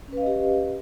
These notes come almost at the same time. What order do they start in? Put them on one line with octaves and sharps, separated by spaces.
C#4 B4 F5 D#5 G4